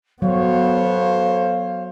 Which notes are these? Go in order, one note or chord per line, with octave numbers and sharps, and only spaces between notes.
F#3 B3 A4 C5 C#5 F5